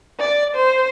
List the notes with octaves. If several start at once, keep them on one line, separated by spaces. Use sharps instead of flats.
D5
C5